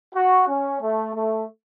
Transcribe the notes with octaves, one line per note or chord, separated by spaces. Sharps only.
F#4
C#4
A3
A3